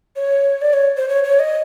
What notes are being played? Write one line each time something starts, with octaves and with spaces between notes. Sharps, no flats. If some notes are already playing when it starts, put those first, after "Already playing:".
C#5
D5
C#5
C5
C#5
C#5
D#5